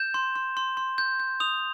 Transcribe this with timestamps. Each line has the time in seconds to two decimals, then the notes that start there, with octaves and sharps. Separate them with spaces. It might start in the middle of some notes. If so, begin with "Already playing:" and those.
Already playing: G6 E7
0.14 C6
0.36 C6
0.57 C6
0.77 C6
0.98 G6
1.20 G6
1.40 D#6 F7